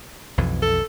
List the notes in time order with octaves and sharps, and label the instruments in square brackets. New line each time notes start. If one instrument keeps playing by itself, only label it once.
[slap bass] B1 F2 E3
[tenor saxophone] A4